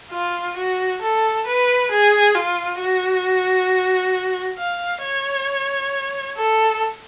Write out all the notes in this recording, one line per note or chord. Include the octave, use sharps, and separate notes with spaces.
F4
F#4
A4
B4
G#4
F4
F#4
F5
C#5
A4